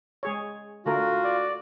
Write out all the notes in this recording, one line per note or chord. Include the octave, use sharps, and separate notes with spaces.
G#3 G#4 C#5
D3 A3 F4 F#4 A#4
D5